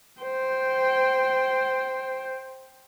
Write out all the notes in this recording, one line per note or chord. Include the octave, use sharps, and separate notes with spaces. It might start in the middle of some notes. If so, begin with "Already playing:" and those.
C5 G5